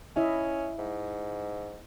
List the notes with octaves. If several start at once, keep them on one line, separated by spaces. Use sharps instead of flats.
C#4 E4 D#5 E5
G#2